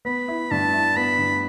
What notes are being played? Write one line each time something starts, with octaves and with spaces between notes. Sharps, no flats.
B3 B5
E4
G2 A5
E4
B3 B5
G2